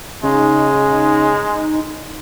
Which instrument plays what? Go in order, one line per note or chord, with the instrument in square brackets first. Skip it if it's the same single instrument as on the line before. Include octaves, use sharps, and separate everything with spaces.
[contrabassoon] C#3 [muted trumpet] G#3 [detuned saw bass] D#4